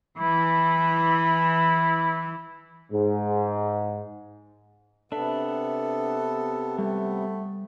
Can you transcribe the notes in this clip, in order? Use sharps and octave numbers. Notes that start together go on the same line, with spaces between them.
E3 E4
G#2
C3 B3 D4 A4 E5
G3 A3